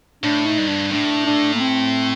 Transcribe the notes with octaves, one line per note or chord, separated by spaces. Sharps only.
A2 D4
D#4
G2
D4
A2 D4
D4
A#3
C4